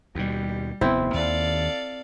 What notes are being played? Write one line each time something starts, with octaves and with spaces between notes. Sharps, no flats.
D#2 B2 G3
F1 D#2 B3 C4 E4
D#2 A4 D5 F5